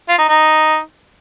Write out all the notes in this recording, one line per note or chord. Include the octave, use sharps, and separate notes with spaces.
F4
D#4
D#4